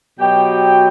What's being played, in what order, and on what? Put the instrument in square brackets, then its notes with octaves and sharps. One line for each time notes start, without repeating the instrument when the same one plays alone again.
[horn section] B2 F#3 G4 G5